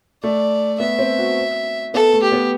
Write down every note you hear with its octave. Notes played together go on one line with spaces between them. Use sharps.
A3 D5
B3 E5
C4
F#4
B3 A4
A3
G4
B3